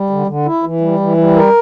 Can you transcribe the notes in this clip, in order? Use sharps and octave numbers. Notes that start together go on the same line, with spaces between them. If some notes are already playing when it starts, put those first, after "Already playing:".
Already playing: G3
D3
D3
E4
E3
G3
E3
G3
A#4